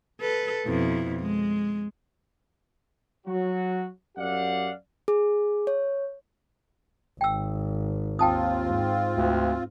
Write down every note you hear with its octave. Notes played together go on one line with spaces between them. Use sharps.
A4 B4
F2 B2 E4
G#3
F#3 F#4
F#2 G4 D5 F5 F#5
G#4
C#5
G#1 G5 E6
D#2 C4 F4 G5 A5 D#6
G#2
D2